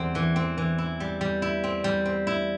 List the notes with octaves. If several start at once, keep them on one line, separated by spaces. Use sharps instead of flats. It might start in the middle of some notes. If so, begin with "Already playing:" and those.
Already playing: E2 G3 C4
E3
C4
E3
E4
G3
G3
E4
C4
G3
C4
E4